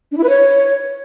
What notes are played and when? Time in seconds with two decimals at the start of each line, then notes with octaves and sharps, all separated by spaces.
0.12 D4
0.18 E4
0.23 B4
0.29 C#5